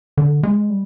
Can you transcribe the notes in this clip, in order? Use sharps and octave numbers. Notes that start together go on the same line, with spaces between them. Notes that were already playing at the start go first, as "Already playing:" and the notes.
D3
G#3
G3